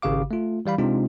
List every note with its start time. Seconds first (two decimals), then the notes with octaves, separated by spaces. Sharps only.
0.02 G#1 C#3 G4 F5 D6
0.31 A3 F4
0.66 E3 G3 F5 B5
0.78 C3 G#3 C4 D4 D#4 F4